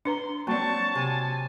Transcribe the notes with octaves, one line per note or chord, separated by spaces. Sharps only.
D4 B4 A#5 C6
F#3 A#3 C4 D5 A5 C#6
C3 G#5